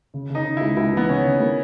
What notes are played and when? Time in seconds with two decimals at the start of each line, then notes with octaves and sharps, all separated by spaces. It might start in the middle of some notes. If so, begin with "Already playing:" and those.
0.14 C#3
0.30 C#3 D#4
0.46 C#3
0.57 C#2 E4
0.77 C#2 E4
0.93 E3 B3
1.09 C#3 C#4
1.25 C#3
1.40 A#3